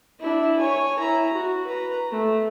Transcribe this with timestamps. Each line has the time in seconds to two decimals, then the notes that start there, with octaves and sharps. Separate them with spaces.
0.20 D4 E4
0.59 C#5 G#5
0.99 E4 A#5
1.33 F#4
1.66 B4 A#5
2.11 A3